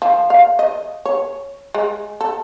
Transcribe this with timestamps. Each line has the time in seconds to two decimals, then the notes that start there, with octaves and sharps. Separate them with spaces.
0.02 F3
0.30 F5
0.59 D#5
1.05 C#5
1.74 G#3
2.21 A4